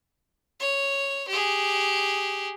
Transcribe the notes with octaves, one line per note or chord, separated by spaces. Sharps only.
C#5
G4 G#4